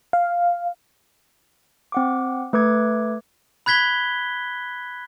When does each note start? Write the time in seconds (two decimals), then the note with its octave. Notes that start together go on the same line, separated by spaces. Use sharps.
0.13 F5
1.92 C4 F#5 D6
2.53 A3 B4 D6 G#6
3.66 B5 F#6 G#6 B6 G7